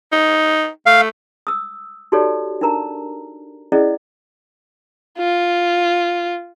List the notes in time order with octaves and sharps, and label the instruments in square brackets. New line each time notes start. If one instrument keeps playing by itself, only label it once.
[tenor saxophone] D#4
[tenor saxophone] A3 [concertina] F5
[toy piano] D#6 E6
D#4 F#4 G4 A4 C#5 D5
D4 D#4 A#4 A#5
C#4 E4 G#4 D5 D#5
[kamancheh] F4